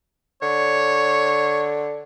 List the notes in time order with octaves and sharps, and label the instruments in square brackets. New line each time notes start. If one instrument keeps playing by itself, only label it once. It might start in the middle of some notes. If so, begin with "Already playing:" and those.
[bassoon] D3 [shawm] C#5